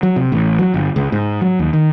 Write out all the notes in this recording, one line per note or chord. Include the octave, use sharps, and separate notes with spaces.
F#3
C3
A1
F#3
G1
C#2
G#2
F#3
D#2
D#3